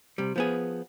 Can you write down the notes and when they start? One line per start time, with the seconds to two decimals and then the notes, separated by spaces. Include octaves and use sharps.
0.18 C3 G3
0.36 F3 B3 G#4